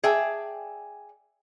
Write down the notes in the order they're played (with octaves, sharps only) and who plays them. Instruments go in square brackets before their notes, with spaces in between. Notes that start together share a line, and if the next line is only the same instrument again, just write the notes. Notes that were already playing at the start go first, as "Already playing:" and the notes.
[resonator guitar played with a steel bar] G#4 D5 E5 G5 A5